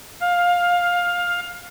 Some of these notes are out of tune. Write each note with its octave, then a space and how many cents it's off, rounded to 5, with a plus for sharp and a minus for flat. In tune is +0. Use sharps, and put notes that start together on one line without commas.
F5 +15